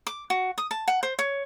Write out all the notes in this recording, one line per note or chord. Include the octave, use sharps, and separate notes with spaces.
D6
F#4
D#6
A5
F#5
C5
C#5